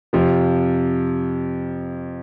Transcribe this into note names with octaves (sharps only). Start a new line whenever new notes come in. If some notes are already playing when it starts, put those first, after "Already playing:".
F2 C3 F3